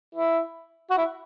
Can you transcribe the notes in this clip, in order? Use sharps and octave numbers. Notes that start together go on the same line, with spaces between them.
E4
F#4
E4